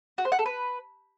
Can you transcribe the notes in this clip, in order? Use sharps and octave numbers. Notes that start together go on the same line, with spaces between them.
F#4
C5
F#5
A4
B4